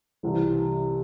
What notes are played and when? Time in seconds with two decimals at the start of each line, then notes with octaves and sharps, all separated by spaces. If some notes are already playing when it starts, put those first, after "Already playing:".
0.23 C2 C3 E3 G3